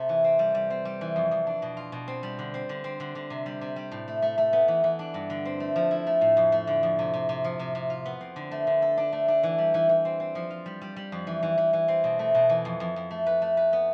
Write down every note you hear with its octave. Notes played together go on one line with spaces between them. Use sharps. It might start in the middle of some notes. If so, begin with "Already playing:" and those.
Already playing: C3 A3
E3
C4
G3
G3
C4
G3
E3
F2
F2
D4
B2
F4
B2
C4
G3
D3
C4
D3
C4
D3
D3
C3
G3
C3
G3
A2
A3
A3
A3
B3
E3
E3
D4
G2
D3
C4
A3
F3
E4
A3
A2
F2
A3
D3
F2
C3
C3
C3
F3
C3
C3
F4
B3
C4
D3
A3
D3
A4
D4
A3
D4
E3
G3
E3
E3
C4
C4
F3
F4
G3
G3
G3
F2
E3
E3
E3
E3
C4
B2
A3
B2
E3
F2
F2
F2
A3
B4
A3
B4
B3